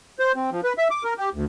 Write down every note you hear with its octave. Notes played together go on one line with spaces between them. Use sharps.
C5
C4
F3
B4
E5
D6
A#4
G4
D2